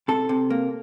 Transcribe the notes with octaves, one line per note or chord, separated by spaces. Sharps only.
C3 A4
C3
A#3